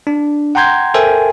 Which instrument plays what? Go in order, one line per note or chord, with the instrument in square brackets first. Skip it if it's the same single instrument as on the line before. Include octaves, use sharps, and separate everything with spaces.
[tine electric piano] D4
F#5 G5 A#5 C6 G6 G#6
A4 A#4 C5 E5 G5 G#5